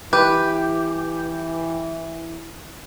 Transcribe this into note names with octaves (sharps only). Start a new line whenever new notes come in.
E3 G4 B4